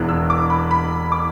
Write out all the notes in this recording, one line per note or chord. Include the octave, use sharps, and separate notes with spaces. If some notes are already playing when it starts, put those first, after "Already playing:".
Already playing: E1 E2 E3 F#6
E6
D6
B5
B5
D6